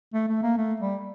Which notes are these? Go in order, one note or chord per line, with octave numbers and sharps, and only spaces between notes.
A3
A3
A#3
A3
G3